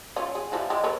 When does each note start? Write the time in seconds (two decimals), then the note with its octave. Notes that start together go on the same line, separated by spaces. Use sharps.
0.16 C#4 F4
0.35 G#4
0.52 E3 F3 G3
0.70 G#3 G4
0.84 A#4 B4 C#5